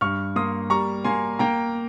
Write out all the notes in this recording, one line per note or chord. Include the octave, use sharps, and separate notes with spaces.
G2 C#6 F6
A#3 C6 D#6
G3 A#5 C#6
A#3 G#5 C6
A#3 G5 A#5